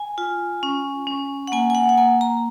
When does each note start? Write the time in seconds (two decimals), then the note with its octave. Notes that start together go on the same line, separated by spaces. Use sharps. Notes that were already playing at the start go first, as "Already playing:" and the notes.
Already playing: G#5
0.18 F4
0.63 C#4
1.07 C#4
1.47 F#5
1.52 A#3 G#5
1.70 G#5
1.75 F#5
1.89 F#5
1.98 A#3 G#5
2.21 A#5